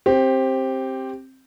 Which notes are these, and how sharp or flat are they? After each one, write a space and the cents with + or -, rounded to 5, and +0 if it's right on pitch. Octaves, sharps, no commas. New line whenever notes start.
C4 +15 G4 +0